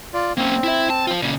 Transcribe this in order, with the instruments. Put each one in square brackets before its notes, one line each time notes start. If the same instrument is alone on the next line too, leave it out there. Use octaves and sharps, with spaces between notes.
[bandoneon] F4 D5
[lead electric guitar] A#3 C#4 [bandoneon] C4
[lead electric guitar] E4 E5
A5
F4 C5
A#2 C#3